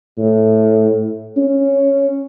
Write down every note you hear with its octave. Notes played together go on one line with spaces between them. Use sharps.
A2
C#4